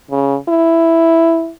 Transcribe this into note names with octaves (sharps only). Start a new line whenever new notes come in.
C#3
E4